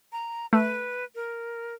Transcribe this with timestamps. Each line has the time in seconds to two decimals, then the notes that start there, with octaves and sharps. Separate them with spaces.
0.12 A#5
0.53 A3 B4
1.15 A#4